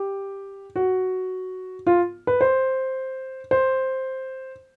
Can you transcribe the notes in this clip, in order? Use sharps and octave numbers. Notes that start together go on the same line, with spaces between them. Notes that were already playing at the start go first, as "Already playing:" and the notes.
Already playing: G4
F#4
F4
B4
C5
C5